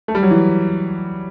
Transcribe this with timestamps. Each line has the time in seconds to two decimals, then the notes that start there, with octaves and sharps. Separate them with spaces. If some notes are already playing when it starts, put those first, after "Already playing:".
0.08 A3
0.15 G3
0.23 F#3
0.31 E3